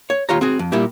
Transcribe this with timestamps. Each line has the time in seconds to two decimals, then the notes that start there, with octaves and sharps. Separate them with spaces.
0.10 C#5
0.29 D#2 F4 G4 C#5 A#5
0.41 C4 F#4 G#4
0.59 F2
0.72 A#2 G3 E4 G4